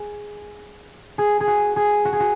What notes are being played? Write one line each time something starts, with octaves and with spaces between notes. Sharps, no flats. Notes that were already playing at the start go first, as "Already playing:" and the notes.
Already playing: G#4
G#4
G#4
F#4
G#4
F#4
G#4
F#4